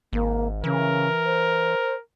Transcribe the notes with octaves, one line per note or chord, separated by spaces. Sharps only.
G#1 A#3
C#3 E3 A#4
C5